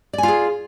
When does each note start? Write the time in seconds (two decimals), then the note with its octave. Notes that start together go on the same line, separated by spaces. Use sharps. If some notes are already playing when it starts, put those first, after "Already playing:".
0.13 D5
0.18 G#5
0.23 F4
0.28 G#4